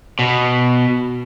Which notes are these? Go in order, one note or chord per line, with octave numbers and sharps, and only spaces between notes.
B2